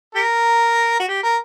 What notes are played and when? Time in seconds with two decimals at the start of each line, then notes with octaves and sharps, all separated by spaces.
0.15 G4 A#4
1.00 F#4
1.08 G4
1.23 A#4